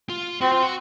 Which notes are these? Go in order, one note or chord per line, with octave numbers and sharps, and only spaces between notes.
F4
C4 F#4
F4
F#4